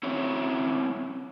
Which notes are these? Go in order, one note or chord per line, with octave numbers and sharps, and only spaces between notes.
C4 C#4 E4 C#5 E5